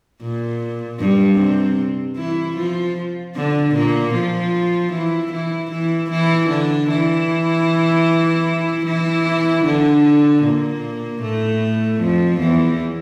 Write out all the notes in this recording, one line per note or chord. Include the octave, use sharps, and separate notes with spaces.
A#2
G2 G3
C3 C4
E3 E4
F3 F4
D3 D4
A#2 A#3
F3 F4
E3 E4
E3 E4
E3 E4
E3 E4
D3 D4
E3 E4
E3 E4
D3 D4
A#2 A#3
A2 A3
F2 F3
E2 E3